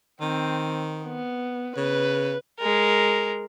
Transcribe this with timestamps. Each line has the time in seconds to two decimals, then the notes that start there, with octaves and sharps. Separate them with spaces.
0.21 D#3 C4
1.04 B3
1.77 C#3 B4
2.59 G#3 A#4